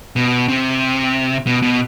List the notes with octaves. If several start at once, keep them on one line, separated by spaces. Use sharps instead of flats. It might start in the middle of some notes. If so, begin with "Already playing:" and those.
B2
C3
B2
B2